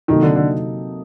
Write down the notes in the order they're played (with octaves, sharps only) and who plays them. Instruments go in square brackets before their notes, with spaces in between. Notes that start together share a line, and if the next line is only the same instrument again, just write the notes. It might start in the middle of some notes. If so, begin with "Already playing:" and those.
[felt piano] C3 F#3 A#3 D#4 A4 [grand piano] D#3
[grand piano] D3
D3